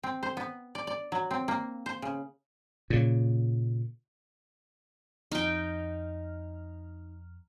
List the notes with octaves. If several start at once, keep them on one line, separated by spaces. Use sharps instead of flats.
C4
C5
B3
D5
D5
F#3
C4
A#3
C5
C#3
A#2 C#3
F2 D#4 G5 F6